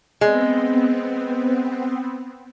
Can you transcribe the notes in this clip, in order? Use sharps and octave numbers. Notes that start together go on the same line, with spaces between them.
G#3 B3 C4